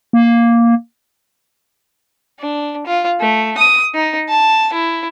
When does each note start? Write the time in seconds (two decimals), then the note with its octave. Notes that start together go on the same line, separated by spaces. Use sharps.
0.13 A#3
2.40 D4
2.86 F4
3.20 A3
3.57 D#6
3.94 D#4
4.29 A5
4.73 E4